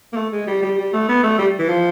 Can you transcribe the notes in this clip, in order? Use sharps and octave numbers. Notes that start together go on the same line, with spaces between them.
A#3
A3
G#3
G3
G3
G3
A3
B3
A3
G3
E3
F3